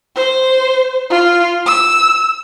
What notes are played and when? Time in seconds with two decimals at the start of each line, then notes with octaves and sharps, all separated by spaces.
0.16 C5
1.10 F4
1.66 E6